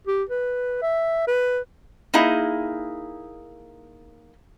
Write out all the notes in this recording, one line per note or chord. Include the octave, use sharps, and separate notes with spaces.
G4
B4
E5
B4
A#3 D#4 E4 G#4